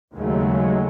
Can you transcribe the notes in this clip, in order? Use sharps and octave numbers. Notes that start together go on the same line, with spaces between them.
D#2 C#3 F#3 G#3 A3